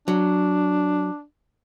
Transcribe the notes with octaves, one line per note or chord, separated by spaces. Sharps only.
F#3 D4